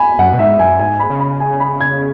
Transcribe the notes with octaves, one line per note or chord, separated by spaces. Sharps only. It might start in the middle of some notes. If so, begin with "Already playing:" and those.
Already playing: G#5 B5
F#2 F#5
B2
G#2 E5
F#2 G#5
G#2 G#5
B5
C#3
B5
G#5
B5
G#6